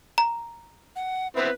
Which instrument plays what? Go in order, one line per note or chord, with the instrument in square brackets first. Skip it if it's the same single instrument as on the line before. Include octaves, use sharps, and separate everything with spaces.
[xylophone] A#5
[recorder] F#5
[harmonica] B3 C4 E4 [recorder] B4